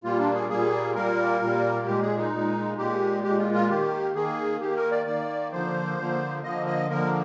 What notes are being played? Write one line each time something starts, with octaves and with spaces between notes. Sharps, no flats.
A#2 G3 A#3 F4
D4
G#4
A#2 G3 A#3 G#4
A#2 G3 A#3 A#4
A#2 G3 A#3
A#2 G#3 G4
G#4
D#4
A#2 G#3
A#2 G#3 G4
A#2 G#3 G4
F4
F4
D#3 A#3 G4
D#3 A#3 G#4
D#3 A#3 G4
A#4
D5
D#3 A#3 D5
D3 F3 A#3 C5
D3 F3 A#3
D3 F3 A#3 D#5
D#5
D3 F3 A#3 A#4